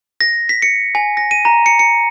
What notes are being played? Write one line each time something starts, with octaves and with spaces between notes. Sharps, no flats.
A#6
B6
C#7
G#5
A#6
D#7
A#5
C#7
C#7